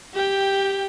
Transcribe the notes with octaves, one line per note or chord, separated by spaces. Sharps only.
G4 G5